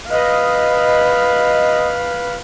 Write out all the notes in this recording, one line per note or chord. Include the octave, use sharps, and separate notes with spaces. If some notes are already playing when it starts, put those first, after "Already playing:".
B4 D#5 F5